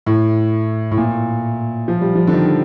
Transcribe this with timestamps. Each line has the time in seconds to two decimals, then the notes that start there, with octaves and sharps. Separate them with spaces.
0.06 A2
0.91 A2
0.97 A#2
1.88 F3
2.01 G3
2.16 F3
2.27 D3
2.33 D#3